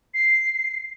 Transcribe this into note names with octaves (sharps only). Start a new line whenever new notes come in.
C7